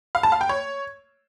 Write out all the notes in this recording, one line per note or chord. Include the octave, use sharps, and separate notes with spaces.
F5
A5
F5
G5
C#5